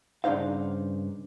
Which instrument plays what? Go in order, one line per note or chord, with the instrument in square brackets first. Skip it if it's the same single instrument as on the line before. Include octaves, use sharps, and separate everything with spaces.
[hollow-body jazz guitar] G2 C#3 D4 D#4 C5 F5